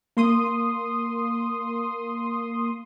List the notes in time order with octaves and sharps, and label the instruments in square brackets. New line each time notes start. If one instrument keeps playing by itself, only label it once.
[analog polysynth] A#3 C6 D#6